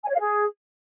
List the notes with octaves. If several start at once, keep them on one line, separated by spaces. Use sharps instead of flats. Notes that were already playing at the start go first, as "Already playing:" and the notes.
G#5
C#5
F5
G#4